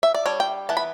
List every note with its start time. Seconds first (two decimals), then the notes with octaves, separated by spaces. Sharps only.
0.03 E5
0.15 D5
0.26 G3 D4 C#5
0.40 G5
0.69 E3 B3 A5
0.77 B5